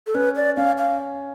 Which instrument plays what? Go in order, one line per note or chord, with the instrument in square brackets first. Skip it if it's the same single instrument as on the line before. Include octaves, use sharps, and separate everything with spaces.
[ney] A4
[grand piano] C#4 [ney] B4
[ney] D5
[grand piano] C#4 [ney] F5
[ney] F5